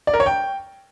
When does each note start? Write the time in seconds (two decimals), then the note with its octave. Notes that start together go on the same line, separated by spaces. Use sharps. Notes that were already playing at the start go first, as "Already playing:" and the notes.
0.07 D5
0.14 A#4
0.20 C#5
0.26 G5